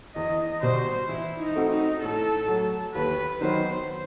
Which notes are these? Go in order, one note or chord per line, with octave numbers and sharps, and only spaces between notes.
E2 D#5
B2 G3 C5
E3 E4
D#4
A3 C4 F#4 A4
D#4
A2 A4
F#3 A3
D#2 B4
D#3 F#3 B3 D#4 C5